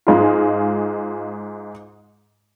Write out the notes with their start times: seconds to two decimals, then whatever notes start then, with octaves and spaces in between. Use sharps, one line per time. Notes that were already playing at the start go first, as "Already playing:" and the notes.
0.07 G#2 G#3 F4